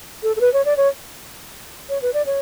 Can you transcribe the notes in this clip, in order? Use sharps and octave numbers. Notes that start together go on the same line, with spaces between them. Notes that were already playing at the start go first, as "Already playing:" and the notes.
A4
A4
B4
C#5
D5
C#5
C#5
B4
D5
C#5